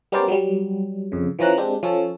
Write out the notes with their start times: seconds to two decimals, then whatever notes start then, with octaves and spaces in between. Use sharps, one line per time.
0.12 G3 B3 C#4 A#4 C5 D5
0.28 F#3 G3
1.12 F2 C#3
1.39 E3 F3 C#4 A#5 F#6
1.57 G#3 C4 D4 G4
1.83 F3 C#4 A4